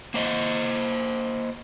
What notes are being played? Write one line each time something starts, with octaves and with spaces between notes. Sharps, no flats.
A#3 C5 D#5